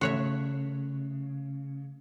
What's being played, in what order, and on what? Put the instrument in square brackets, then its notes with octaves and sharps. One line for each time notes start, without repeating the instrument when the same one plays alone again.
[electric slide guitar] C#3 [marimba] A3 A4 [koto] F#4 C#5 E5